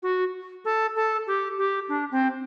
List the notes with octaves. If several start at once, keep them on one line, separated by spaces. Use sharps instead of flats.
F#4
A4
A4
G4
G4
D4
C4